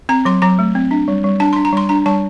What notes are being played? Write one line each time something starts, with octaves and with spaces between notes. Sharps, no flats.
C4 A#5
F#3 C6
F#3 A#5
A3
C4
D4
G3
G3
D4 A5
C6
D4
A#5
G3 C6
D4 A#5
G3 A5